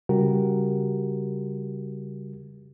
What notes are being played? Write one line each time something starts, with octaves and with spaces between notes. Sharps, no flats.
C#3 G3 F#4 G4 A#4